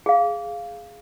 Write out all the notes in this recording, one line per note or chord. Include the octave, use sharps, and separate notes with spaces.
G#4 F5